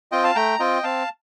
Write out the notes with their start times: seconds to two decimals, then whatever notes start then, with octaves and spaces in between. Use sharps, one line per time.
0.12 C4 F4 D#5 G5
0.24 F5 A5
0.35 A3 G5 A#5
0.59 C4 F4 D#5 G5
0.83 C4 F5 A5